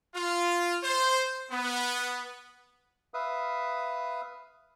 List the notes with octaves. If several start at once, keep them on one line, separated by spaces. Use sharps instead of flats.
F4
C5
B3
B4 E5 F5 D#6